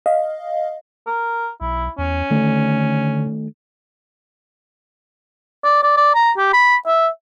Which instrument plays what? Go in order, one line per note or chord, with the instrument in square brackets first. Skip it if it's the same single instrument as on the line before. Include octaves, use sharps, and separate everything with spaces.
[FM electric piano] D#5 F5
[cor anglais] A#4
[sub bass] B1 [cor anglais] E4
[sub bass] E2 [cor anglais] C#4
[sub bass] D3 [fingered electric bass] D#3 A3
[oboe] D5
D5
D5
A#5
G4
B5
E5